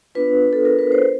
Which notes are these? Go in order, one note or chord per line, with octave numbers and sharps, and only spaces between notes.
B3 D4 F4 B4
A4
A#4
B4
C5